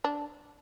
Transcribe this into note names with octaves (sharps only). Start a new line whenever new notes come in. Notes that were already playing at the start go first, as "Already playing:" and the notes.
D4